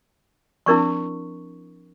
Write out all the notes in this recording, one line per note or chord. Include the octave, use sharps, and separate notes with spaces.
F3 C4 D4 E4 A#4 C#6